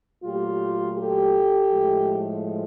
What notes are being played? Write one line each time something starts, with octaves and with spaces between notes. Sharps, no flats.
A#2 F#3 A3 F4 G4
G4 A4
A2 F3 G#3